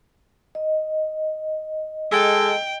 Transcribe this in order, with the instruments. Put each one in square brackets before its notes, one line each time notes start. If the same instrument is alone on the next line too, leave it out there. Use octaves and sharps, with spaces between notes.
[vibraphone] D#5
[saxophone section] G#3 A4 [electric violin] G5